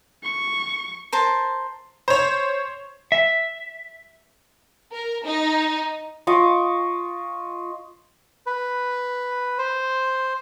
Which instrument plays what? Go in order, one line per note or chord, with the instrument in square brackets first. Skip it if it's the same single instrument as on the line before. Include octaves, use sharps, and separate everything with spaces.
[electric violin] C#6
[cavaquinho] A#4 C5 A5
[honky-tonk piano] C5 C#5
[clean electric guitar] E5
[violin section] A#4
D#4
[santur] F4 D#5 C#6 D6
[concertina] B4
C5